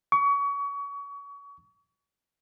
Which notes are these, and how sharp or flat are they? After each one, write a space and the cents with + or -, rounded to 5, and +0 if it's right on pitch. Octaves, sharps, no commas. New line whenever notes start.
C#6 +30